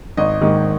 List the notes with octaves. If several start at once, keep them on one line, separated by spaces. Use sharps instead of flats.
G#1 D#5
G#2 D#3